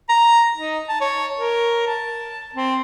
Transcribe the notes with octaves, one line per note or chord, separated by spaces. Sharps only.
A#5
D#4
A5
C#5
A#4
A5
C4